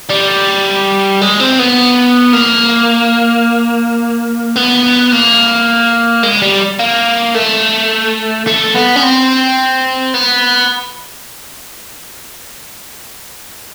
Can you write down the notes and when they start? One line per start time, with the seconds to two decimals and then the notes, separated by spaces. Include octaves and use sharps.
0.09 G3
1.21 G#3
1.40 C4
1.59 B3
2.33 A#3
4.56 B3
5.12 A#3
6.23 G#3
6.42 G3
6.79 A#3
7.35 A3
8.47 A3
8.74 B3
8.96 C#4
9.02 C4
10.14 B3